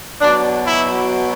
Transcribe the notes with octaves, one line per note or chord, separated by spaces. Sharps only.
B2 F#3 D4
E4